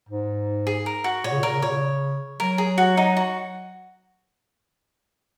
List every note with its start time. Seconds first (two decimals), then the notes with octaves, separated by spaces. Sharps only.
0.09 G#2
0.67 G#4
0.86 A#4
1.04 F#4
1.24 A#2 C#5
1.32 C#3
1.40 A#2 A#4
1.54 C#3
1.62 A#2 C#5
1.71 C#3
2.39 F#3 A#4
2.58 G#4
2.78 F#4
2.97 D#4
3.17 F#4